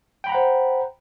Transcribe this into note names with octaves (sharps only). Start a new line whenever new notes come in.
C5 F#5 G5 A#5 B5